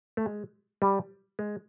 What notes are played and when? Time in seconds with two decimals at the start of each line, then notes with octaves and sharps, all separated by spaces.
0.17 A3
0.26 G#3
0.82 G3
1.39 G#3